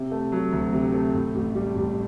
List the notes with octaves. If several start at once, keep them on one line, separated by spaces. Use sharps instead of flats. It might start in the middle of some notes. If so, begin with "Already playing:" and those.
Already playing: C3
A3
F#3
D2
C3
A3
A2
A1
G3
A1